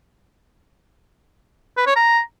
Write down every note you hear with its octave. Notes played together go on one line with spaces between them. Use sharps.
B4
C#5
A#5